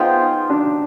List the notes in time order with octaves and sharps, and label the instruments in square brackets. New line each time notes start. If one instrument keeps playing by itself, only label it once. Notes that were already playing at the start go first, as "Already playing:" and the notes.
Already playing: [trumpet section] B3 F4 G#4 C5 G5 [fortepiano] D#4
[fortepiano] D4